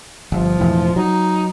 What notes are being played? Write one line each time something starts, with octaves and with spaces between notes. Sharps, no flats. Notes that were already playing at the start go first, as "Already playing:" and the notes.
G1 F3
E1 A2 E3
F#3 D#4